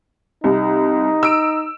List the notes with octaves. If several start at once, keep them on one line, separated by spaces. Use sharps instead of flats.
C2 D#4
E6 D7